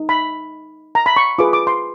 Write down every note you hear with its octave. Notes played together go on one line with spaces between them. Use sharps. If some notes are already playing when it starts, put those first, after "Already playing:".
Already playing: D#4
B5
A#5
B5
C#6
F4 G#4 B4 D6
D6
C6